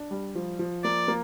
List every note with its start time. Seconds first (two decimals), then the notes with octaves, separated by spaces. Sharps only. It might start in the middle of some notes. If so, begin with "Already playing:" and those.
Already playing: D4
0.11 G3
0.35 F3
0.59 F3
0.84 A#3 D5
1.08 A#3